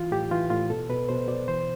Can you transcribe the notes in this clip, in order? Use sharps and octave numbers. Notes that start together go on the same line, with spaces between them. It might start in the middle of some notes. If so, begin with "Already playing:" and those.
Already playing: E3 F4
A2 G4
E3 F4
A2 F4
B2 A4
B2 B4
B2 C5
B2 D5
E3 C5